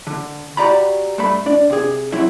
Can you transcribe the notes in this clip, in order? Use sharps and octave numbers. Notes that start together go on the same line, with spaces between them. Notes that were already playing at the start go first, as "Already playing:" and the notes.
D3
F#4 G4 D5 A#5 B5
G2 A3 B5
D4 D5
C3 G#4
F#3 C4 E4 E5